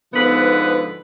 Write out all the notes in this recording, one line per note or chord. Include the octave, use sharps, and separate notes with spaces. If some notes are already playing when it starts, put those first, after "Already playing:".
G#2 B2 D3 F3 B3 B4